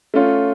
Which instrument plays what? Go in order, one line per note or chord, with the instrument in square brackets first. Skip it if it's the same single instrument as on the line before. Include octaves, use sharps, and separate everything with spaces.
[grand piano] A3 C#4 F4